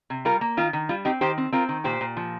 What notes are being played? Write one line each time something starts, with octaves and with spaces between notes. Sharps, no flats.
C3
G3 F4 A#4
A#3
D#3 F4
D#3
G3 F4
C4 D#4 G4
D#3 G4 C5
C4
C4 F4 A#4
D#3
A#2 G4 C5
A#2
F3